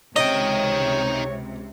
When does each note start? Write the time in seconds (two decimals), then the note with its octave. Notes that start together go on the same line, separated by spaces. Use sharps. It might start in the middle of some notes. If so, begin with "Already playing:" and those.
0.16 C#2 C3 D#4 C#5 D#5 G5